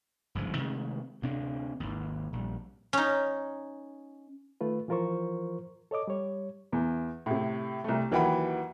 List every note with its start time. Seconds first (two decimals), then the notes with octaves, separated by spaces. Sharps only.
0.35 G1 C#2 G#2 F3
0.57 C3 D#3 G#3 A3
1.22 D2 C3 C4 D4
1.80 G#1 D#2
2.33 A#1 G3
2.93 C#4 D#4
4.61 D#3 A3 F4 B4
4.88 E3 F3 F4 A#4 C5 C#6
5.91 A4 C#5 D#5 D6
6.08 G3 C#5
6.72 E2
7.26 A2 C3
7.84 C2 A3
8.11 D#2 E3 F#3 F#5 G5 B5